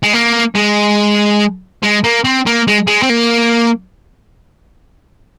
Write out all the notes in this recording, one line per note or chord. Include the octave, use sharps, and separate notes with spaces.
G#3
A#3
G#3
G#3
A#3
C4
A#3
G#3
G#3
C4
A#3